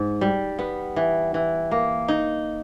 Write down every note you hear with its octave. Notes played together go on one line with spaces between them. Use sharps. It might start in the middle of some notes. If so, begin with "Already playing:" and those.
Already playing: G#2
G3
B3
E3
E3
A#3
D#4